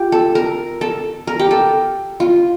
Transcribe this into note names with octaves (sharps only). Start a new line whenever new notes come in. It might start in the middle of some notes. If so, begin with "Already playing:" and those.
Already playing: F4 G4
A4
A#4
A4
A#4
G4
A4
F4